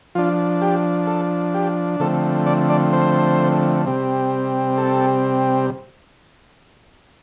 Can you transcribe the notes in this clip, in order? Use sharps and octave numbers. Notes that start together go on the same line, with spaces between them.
F3 D4 F4
G4
A4
G4
D3 F3 A3 C4 A4
D5
D5
C5
C3 G3 C4
A4